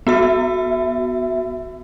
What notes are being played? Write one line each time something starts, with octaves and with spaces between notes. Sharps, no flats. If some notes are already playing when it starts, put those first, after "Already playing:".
B3 F#4 E5